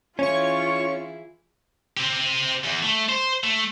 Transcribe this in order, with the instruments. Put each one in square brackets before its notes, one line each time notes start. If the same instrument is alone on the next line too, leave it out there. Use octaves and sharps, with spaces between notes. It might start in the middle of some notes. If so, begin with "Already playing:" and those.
[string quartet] E3 E4 G#4 [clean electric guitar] C#4 [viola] F4 [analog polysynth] C#5 C#6
[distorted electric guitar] C4 G4
E2
A3
C5
A3